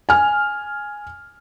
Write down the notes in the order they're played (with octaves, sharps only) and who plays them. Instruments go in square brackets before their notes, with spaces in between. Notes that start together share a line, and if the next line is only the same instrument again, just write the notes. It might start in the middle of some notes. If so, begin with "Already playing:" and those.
[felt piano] G#5 F6